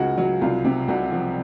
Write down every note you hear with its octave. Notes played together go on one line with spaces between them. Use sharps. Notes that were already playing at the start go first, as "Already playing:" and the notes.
Already playing: C#2 C#3 F#4
F#3
C2 F4
C3
C2 F#4
F3